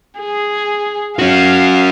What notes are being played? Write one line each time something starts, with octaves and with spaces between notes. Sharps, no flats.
G#4
C#4 F#4 F5